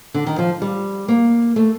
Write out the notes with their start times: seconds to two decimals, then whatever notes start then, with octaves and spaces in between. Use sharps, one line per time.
0.14 D3
0.26 D#3
0.38 F3
0.62 G3
1.08 A#3
1.56 A3